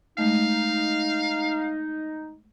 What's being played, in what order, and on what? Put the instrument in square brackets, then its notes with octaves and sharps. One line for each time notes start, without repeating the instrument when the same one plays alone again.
[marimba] G#3 A3 [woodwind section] D#4 [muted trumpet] F5